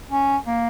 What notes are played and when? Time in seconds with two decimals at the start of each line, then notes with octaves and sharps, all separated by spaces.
0.10 C#4
0.47 A#3